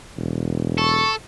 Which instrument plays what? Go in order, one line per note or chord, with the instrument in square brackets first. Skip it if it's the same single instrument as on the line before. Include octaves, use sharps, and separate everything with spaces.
[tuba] E1
[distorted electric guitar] A4 [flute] C#6